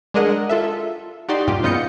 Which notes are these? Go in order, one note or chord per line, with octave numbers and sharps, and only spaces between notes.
G#3 D4 G#4 A#4 D#5 F#5
F4 A4 E5
D#4 F#4 G4 D5 C6
G2 A#2 F4 G4
C#3 B3 F4 D#5 G6 C#7